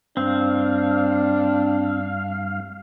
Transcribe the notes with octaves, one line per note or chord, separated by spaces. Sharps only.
G2 C4 D4 F5